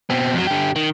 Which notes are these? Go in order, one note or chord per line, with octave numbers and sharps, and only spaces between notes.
B2 C4
F2 F#3
D3 G4
D#3